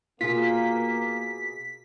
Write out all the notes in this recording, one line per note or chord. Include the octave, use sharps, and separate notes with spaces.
B2 A#3 F4 G#4 B6